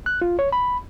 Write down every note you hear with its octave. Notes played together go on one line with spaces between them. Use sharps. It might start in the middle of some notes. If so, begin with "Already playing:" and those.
F#6
F4
C#5
B5